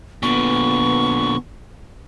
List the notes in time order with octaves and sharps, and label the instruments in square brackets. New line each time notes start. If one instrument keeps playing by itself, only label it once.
[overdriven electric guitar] A#2 D3 [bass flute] B3 [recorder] C#6